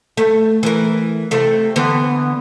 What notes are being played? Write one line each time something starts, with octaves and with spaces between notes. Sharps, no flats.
A3
E3 A#4
C3 A3
D3 E3 B3